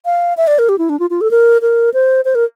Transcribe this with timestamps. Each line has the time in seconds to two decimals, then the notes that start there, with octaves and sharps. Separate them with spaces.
0.05 F5
0.37 E5
0.47 D5
0.59 A#4
0.69 G4
0.78 E4
0.89 D4
1.00 F4
1.10 F4
1.21 A4
1.31 A#4
1.62 A#4
1.94 C5
2.25 C5
2.35 A#4